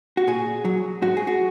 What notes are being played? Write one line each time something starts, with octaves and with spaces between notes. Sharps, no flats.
F#4
A#2 G#4
F#3
G#2 F#4
G#4
F#4